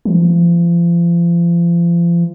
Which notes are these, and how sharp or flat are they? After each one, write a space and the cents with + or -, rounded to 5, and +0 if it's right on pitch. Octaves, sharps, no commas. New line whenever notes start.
F3 -35